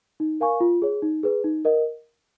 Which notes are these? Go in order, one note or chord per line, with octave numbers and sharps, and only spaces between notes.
D#4
A#4 F5 G#5 C#6
F4
G#4 C#5
D#4
G#4 B4
D#4
A#4 D#5 F#5